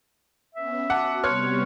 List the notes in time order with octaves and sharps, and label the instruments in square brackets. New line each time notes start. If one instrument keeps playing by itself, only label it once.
[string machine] B3 C#4 [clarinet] E5
[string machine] F#4 [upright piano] F#5 [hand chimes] A5 D6
[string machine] C3 G3 B3 [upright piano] C#5 F6 [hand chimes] C6 F#6 C#7